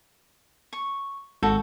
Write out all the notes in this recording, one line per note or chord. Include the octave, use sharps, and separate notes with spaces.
C#6
G#1 F#4 A4 G5